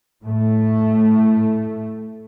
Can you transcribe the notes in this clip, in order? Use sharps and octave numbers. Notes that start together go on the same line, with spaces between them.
A2 A3